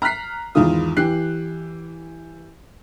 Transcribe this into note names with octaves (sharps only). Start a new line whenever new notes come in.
A#5 F6 F#6 B6 C7
E2 G#2 D#3 E4 F4 D#6
E3 G4 F#6 C7